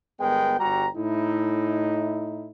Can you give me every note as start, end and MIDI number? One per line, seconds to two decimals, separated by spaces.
0.20 0.56 31
0.20 0.56 56
0.20 0.56 59
0.20 0.56 70
0.20 0.56 79
0.60 0.88 31
0.60 0.88 55
0.60 0.88 66
0.60 0.88 79
0.60 0.88 82
0.96 2.51 45
0.96 2.51 63
0.96 2.51 64